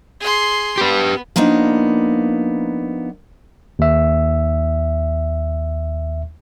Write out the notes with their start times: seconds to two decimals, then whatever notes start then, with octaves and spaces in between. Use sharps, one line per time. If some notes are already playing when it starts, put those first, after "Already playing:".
0.20 G#4 C6
0.78 B3 G4 B4
1.36 F3 A#3 B3 D4 D#4
3.79 D#2 E5